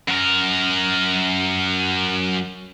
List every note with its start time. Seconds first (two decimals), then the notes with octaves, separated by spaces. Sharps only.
0.08 F#2 A#4